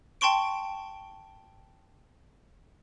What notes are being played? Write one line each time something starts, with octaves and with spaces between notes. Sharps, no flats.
G5 A5 C6 C#6 D7